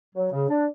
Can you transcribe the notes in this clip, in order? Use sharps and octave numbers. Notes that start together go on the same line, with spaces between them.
F#3
C#3
D4